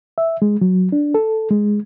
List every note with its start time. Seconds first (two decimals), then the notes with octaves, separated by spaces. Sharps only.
0.18 E5
0.42 G#3
0.61 F#3
0.92 D4
1.14 A4
1.51 G#3